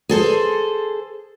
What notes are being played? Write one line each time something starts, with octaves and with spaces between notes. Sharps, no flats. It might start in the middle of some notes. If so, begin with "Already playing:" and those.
G#4 A4 C5